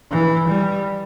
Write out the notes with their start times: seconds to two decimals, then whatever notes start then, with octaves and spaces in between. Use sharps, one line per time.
0.11 E3
0.49 G3